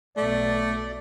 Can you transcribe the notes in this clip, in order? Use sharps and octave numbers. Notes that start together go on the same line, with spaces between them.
B1 B2 A3 D5